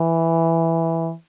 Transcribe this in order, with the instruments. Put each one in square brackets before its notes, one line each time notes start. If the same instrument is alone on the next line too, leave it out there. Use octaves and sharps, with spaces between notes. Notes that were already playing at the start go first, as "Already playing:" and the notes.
Already playing: [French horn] E3